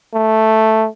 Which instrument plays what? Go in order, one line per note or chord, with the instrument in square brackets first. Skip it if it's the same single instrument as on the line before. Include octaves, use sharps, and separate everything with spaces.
[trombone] A3